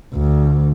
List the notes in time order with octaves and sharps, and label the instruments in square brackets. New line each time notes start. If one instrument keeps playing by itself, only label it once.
[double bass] D2